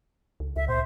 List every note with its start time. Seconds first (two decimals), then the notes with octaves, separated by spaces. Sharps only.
0.40 C#2
0.56 C#2 E5
0.68 A#2 C5